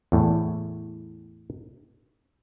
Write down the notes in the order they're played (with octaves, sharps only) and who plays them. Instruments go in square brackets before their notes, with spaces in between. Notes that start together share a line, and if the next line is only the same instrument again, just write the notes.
[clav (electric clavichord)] E2 A2